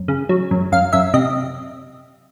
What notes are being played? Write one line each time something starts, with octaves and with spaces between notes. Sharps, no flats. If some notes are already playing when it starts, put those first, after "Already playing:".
Already playing: F#2
C#3
F#3
F#2
F#2 F5
F#2 E5
C3 D#5